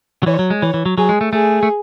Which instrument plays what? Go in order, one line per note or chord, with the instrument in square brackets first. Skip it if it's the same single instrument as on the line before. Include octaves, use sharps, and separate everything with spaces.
[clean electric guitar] F#3
[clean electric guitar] E3 [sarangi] C#5
[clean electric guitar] F#3
G#3
[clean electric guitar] E3 [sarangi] C#5
[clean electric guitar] E3
F#3
[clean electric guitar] F#3 [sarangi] G#4
[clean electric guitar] G#3
A3
[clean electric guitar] A3 [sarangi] G#4
[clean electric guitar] A3